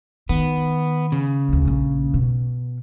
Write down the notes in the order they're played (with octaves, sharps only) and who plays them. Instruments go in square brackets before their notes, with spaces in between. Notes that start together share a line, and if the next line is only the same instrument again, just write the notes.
[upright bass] D#3 [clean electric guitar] B3
[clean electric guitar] C#3
[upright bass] D2 A#3
A#1 A#3
B2